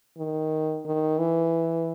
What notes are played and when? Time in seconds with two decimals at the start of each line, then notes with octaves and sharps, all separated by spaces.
0.18 D#3
0.85 D#3
1.19 E3